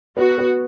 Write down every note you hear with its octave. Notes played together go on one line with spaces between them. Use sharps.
B3 F#4
B3